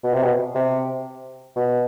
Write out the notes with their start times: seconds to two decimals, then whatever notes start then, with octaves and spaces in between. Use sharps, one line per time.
0.04 B2
0.14 C3
0.24 B2
0.55 C3
1.56 B2